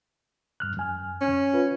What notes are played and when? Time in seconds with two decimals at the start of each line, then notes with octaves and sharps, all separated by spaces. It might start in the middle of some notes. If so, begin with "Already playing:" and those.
0.60 G2 F6 F#6
0.77 F#2 G#5 F6
1.21 C#4
1.54 F4 B4